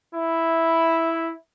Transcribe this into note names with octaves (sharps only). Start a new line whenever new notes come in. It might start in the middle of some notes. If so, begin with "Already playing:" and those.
E4